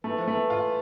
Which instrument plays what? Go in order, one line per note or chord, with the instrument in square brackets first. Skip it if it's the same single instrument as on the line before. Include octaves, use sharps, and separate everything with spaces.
[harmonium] E3 [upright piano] A3
[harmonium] F3
[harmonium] E3 [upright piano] A3
[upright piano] F4